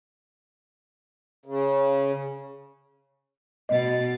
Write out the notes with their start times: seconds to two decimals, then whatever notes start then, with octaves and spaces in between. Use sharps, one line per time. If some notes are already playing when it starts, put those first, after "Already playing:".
1.45 C#3
3.69 B2 D#5 A6